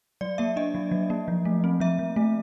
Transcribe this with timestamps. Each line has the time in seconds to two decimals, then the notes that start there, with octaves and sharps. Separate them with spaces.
0.21 F#3 D5
0.38 A#3 E5
0.56 D4 D#5
0.74 F#3
0.91 F#3
1.10 A#3
1.28 F3
1.45 A3
1.64 C4
1.80 F3 E5
1.99 F3
2.16 A3